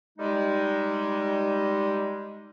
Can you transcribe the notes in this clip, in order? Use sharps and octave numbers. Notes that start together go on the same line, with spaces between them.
G3 G#3 D#4